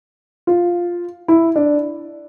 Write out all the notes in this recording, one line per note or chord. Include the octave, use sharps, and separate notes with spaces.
F4
E4
D4